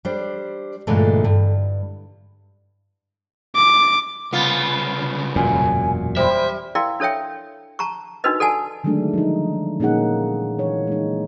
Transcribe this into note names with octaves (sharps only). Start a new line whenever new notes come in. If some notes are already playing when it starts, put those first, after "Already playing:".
G3 D4 C5
G2 A#2 D3 E3 G#3 A3
G2
D6
C2 C#3 B3 F4
E1 F#2 A#2 G#5
G3 C5 E5
E4 A#4 D5 F5 G5 C6
D4 A4 C#5 E5 G5
A5 A#5 C#6
D4 D#4 F#4 A#4 B4 D#5
A4 D5 F#5 G#5 A5
D3 D#3 F#3 G#3 A3 D4
F3 D#4
A#2 A#3 C#4 D#4 G#4 F#5
E3 C#5
G#3 D#4